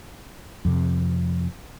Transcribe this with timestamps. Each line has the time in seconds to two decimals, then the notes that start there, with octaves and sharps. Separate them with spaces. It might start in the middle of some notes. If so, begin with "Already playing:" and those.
0.65 F2 C3